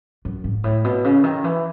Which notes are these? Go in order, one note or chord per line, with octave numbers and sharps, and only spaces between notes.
F#2
G#2
A2
B2
C#3
D#3
E3